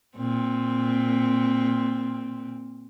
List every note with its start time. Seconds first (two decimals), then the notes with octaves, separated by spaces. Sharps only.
0.17 A#2 C4